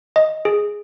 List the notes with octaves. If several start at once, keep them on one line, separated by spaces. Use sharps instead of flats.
D#5
G#4